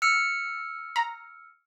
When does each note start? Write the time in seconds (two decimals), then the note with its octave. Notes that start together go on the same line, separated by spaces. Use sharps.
0.02 E6 F6 C#7
0.96 A#5